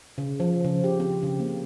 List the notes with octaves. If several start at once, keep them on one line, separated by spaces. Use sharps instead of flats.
C#3
F3
C#3
G4
C4
C#3
A#3